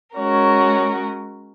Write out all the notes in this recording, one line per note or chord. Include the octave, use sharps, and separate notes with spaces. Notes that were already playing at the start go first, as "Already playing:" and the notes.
G#3 C#4 F#4 A#4 C#5